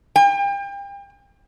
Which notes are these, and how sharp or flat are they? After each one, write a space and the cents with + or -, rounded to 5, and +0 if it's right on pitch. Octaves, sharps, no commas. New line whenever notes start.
G5 +35